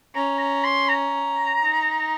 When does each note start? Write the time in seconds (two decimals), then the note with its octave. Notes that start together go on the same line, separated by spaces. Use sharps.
0.15 C#4 A#5
0.40 A#5
0.64 C6
0.89 A#5
1.61 D#4